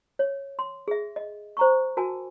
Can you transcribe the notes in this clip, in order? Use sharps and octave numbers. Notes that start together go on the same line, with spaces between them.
C#5
C6
G#4 E5
D#5
C5 A#5 C#6
F#4 A#4 G#5 A5